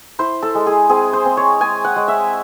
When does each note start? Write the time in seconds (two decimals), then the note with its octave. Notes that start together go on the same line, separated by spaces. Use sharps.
0.19 E4 C5
0.43 A4
0.55 G#3
0.66 G#4
0.90 C4 G#4
1.13 C5
1.25 C4
1.37 C#5
1.60 G#3 G#5
1.84 F#5
1.96 G#3
2.08 E5